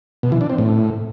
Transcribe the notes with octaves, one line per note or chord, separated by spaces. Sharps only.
B2
E3
D4
C4
A2